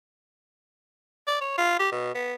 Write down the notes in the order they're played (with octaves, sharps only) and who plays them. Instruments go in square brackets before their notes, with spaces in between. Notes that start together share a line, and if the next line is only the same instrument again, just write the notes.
[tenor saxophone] D5
C#5
F4
G4
B2
B3